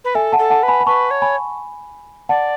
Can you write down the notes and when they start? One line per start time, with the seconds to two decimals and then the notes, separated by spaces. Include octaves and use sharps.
0.04 B4
0.15 A4 E5 G#5
0.32 F#5 A5
0.39 A4
0.50 F#5 A5
0.63 B4
0.68 G#5 B5
0.80 B5
0.86 B4 A5 C#6
1.11 C#5
1.22 G#5 B5
2.29 D5 F#5 A5